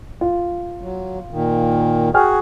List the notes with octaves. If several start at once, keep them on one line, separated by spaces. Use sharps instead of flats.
F4
F#3
A#2 D#3
F#4 G#4 G5 G#5 F6